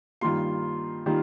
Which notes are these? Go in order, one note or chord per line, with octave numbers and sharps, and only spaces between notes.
G2 D#3 G3 A#3 F4 C6
D#3 G3 A#3 F4